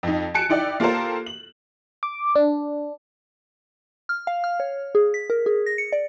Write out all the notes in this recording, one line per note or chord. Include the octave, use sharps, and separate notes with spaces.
F2 D#4
G#5 A5 F#6 C#7 D7
D#4 E4 D5 G5
A#3 F4 G4 A4 A#4 C5
F#7
D6
D4
F6
F5
F6
C#5
G#4
B6
A#4
G#4
A#6
C#7
D5